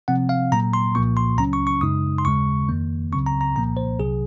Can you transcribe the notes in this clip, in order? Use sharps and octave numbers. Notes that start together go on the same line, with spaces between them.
C3 F3 C4 F#5
F5
A#2 F#3 A#3 A#5
C6
C2 A#2 F3 A#3 F4 C#6
C6
C#2 C#3 F#3 C#4 A#5
C#6
C#6
F#2 C#3 G#3 D#4 D#6
C6
D#2 C#3 G#3 C#6
F2 D#3 A#3
C#2 C#3 F#3 C4 C#6
A#5
A#5
C2 A#2 F3 A#3 A#5
C5
C2 C3 F#3 G#4